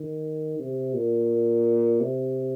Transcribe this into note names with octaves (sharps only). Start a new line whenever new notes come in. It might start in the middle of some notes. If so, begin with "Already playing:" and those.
Already playing: D#3
C3
A#2
C3